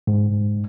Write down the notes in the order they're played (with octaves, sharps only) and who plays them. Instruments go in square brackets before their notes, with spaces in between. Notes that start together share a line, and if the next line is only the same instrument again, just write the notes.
[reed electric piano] G#2